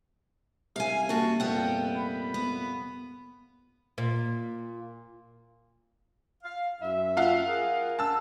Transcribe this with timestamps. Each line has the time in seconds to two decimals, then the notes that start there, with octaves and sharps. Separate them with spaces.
0.76 C2 C3 F5 G#5
1.09 F#2 A#3 F#4 A5
1.40 C2 F2 A#2 B3 F#5 G5
1.97 B5
2.34 B3
3.98 A#2
6.43 F5
6.81 F#2 E5
7.17 F4 F5 F#5
7.48 G#4 A#4
7.99 A5 E6